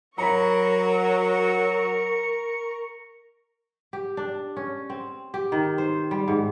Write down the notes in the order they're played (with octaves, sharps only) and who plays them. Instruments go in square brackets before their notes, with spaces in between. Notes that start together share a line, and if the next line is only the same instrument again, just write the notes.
[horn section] F#3 [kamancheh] A#4 C#6 [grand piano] A#5 B5 [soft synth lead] C#7
[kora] G4
D4
C#4
C4
G4
D#3
C5
G3
G#2